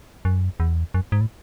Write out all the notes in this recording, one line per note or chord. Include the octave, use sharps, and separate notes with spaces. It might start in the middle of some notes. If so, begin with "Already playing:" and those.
F#2
E2
F#2
G#2
A2